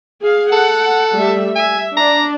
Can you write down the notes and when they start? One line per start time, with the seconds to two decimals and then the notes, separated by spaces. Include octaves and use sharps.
0.22 G#4 F5
0.52 A4 F#5
1.16 G3 A3 E5
1.56 E5 G#5
1.97 D4 A#5